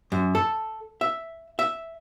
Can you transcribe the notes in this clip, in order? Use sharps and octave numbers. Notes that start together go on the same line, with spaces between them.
F#2
A4
E5
E5